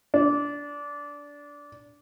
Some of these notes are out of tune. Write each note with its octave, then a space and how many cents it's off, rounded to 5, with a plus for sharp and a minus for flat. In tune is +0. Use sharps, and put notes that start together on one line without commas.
D4 -20